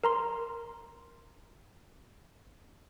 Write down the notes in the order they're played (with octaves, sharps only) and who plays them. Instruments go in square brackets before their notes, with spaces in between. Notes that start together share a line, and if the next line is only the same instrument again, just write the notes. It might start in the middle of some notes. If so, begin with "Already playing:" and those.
[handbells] A#4 A#5 C6